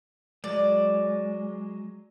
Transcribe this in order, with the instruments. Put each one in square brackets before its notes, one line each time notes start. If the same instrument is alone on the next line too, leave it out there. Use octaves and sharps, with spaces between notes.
[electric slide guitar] F#3 G#3 [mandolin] D5